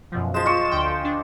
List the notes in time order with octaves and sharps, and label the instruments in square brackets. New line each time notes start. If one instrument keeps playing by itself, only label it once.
[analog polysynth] F#2 B2 F3
[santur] F3 G#3 [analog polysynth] E7
[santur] F4 D#5 C#6
[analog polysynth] D2 G5
D4